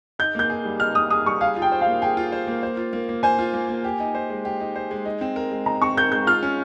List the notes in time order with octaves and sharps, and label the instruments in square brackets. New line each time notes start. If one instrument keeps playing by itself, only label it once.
[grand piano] D#4 [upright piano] G6
[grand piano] A#3 [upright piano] G6
[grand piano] G#4
G3
[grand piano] D#4 [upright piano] F6
[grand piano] A#3 [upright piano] D#6
[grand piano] G#4 [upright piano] D#6
[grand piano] G3 [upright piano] C#6
[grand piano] G#4 [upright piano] F5
[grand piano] F4
[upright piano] G5
[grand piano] C5
[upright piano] F5
[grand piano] A#3
[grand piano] G#4 [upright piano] G5
[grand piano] F4
C5
A#3
C5
F4
A#3
A#3
[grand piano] C5 [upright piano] G#5
[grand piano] F4
A#3
A#3
G4
D#4
C5
G#3
G4
D#4
C5
G#3
D#4
C4
A#4
G#3
[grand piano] D#4 [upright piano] A#5
[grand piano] C4 [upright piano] C#6
[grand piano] A#4 [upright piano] G6
[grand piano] G#3 [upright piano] G6
[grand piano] F4 [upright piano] F6
[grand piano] C#4